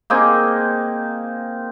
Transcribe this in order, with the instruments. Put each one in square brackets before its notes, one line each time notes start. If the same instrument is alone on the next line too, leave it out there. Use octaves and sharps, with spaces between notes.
[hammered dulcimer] A#3 C4 D#4 G#4